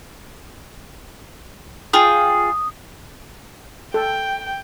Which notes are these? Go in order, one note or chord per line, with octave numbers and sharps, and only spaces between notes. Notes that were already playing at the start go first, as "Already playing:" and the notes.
F4 G#4 G5 D#6
A4 G5